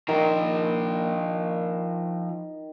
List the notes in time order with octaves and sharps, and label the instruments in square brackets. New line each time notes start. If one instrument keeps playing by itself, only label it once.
[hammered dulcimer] D#3 [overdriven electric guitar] F3 A#4